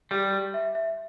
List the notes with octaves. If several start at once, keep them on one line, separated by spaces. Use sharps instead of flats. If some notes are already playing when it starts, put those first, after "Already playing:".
G3 G4
G4
E5
E5